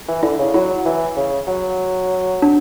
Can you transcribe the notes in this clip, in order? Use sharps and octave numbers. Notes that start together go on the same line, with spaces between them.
E3
D3 E4
C#3
F#3 E4
E3
C#3
F#3
D4